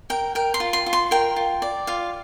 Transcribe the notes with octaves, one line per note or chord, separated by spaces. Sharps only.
A#4 G5
A#4 G5
C6
F4
C6
F4
C6
A#4 G5
F4
D5
F4 F5